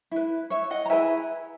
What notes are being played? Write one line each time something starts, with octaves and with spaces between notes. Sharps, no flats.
E4 B4
C#5 E5
D#5 F#5
A#5
E4 G#4 B4 E5 G#5